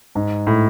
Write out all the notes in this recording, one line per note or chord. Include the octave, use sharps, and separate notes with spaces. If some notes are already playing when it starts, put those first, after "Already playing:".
G#2
A2